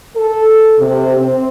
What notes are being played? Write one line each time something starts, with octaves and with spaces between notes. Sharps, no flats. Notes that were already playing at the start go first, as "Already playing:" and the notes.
A4
C3
C4